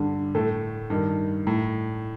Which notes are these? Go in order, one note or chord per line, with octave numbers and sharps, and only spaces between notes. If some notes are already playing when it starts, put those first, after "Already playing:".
Already playing: G2 D3
A2 A3 A4
G2 D#3
A2